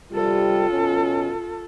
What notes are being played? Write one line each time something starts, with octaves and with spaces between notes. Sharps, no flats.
C3 G3 F4 A4
B2 C#4